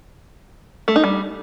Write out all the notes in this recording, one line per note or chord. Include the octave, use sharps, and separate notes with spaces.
A3
D#4
G3